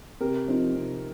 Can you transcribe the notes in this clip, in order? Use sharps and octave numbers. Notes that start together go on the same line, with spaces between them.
C3 G4 A#4
F3 C4 D#4
C3